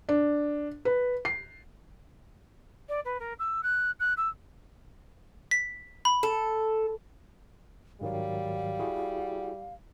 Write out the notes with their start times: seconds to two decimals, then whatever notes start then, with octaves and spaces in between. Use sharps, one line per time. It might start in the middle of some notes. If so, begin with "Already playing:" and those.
0.09 D4
0.85 B4
1.25 C7
2.89 D5
3.05 B4
3.20 A#4
3.39 E6
3.63 F#6
4.00 F#6
4.17 E6
5.51 B6
6.05 B5
6.23 A4
8.01 G#2 D#3 F#3 G3 F5
8.80 E4 F#4 G#4